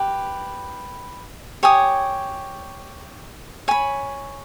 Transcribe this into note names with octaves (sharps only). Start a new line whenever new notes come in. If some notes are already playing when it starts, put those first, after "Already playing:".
Already playing: G4 B4
G4 C#5 G#5 D#6
C#5 G#5 B5